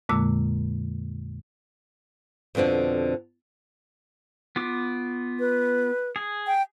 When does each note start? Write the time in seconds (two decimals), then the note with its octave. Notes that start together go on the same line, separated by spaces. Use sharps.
0.09 F2 A#2 D3 G#3 A#3 E6
2.55 F2 B2 D3 C4 D4
4.56 B3 F4 D6
5.40 B4
6.16 G#4
6.47 G5